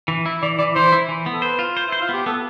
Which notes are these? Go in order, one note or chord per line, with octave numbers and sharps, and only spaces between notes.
E3
E4
E3 D5
E3 D5
E3 C5
E4
E3
B3
A4
B4 C5
F4
C5
E4 C5
F4
B3 G4
B3 A4